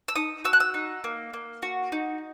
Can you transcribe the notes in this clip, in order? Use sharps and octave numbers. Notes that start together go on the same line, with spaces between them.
E6
D#4 D#6
F#4 E6
F#6
E6
D#4
A#3
A#3
F#4
D#4